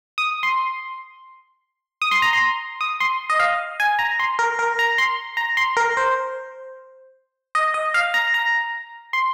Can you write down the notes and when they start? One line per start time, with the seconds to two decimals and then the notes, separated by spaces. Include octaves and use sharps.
0.18 D#6
0.43 C6
2.02 D#6
2.11 C6
2.22 A#5
2.33 C6
2.81 D#6
3.00 C6
3.30 D#5
3.39 F5
3.80 G#5
3.99 A#5
4.19 C6
4.39 A#4
4.59 A#4
4.79 A#5
4.98 C6
5.37 A#5
5.57 C6
5.77 A#4
5.97 C5
7.55 D#5
7.74 D#5
7.94 F5
8.14 A#5
8.34 A#5
9.13 C6